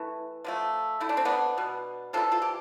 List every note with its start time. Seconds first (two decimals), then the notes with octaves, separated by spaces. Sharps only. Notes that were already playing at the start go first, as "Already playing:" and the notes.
Already playing: E3 A3
0.44 D3 F3 A3
1.00 D3 A3 E4
1.09 D4
1.17 C4
1.25 B3 D4
1.57 B2 B3
2.13 C3 E3 G3 F4 A4
2.32 F4 A4
2.42 G4